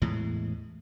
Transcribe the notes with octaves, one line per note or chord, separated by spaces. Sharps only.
E2 A2 G#3